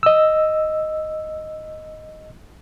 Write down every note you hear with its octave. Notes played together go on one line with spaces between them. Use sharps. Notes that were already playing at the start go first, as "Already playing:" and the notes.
D#5 E6